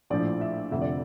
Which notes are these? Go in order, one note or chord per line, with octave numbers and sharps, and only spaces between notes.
A#1 A2 F3 D5
E5
F1 F2 D3 E5
D5